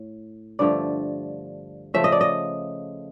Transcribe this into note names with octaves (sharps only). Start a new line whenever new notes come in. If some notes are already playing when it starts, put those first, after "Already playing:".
Already playing: A2
G2 D3 F3 A3 D5
C#3 F3 A3 E5
D#5
D5
D#5